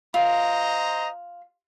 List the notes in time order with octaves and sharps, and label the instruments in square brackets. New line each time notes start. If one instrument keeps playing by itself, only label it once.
[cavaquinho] F4 [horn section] C5 D#5 A#5